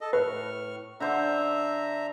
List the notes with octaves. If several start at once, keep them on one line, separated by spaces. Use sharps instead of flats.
A4 D#5
A2 B4 C#6 F6
D3 C5 E5 A#5 D6